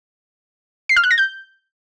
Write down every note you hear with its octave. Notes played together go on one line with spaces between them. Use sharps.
C7
F6
F#6
A#6
G6